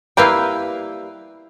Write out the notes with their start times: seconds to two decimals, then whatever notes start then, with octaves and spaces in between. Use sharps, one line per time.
0.17 G3 A#3 E4 B4 F5 G5